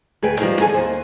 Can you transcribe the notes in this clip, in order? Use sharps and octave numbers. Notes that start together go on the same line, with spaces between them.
D2 G#4 B4 G5
D#3 F3 G3
G#4 A4 G#5
D#2 C5